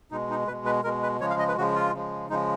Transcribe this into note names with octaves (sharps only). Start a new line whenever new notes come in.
B2 G#3 D#4
D#4
B2 G#3 B4
B4
B2 G#3 A#4
B4
C#3 F3 G#3 C#5
F5
D#5
B4
C#3 F3 G#3 F#4
F4
C#3 F3 G#3
C#3 F3 G#3 D#4